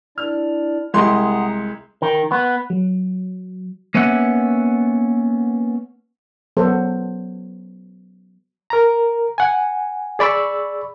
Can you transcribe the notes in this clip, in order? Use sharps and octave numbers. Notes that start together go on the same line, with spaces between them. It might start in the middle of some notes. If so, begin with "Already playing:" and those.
D4 E4 D5 F6
C2 G#3 F#5 A#5 C6 D#6
D#3
B3
F#3
A#3 B3 C#4 E5 F#5
F#3 B3 A4 C5
A#4 A#5
F#5 G#5
G#4 D5 B5 C#6 E6